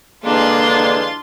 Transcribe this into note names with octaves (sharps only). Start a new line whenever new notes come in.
D3 E3 G#3 A#3 D4 F4 C6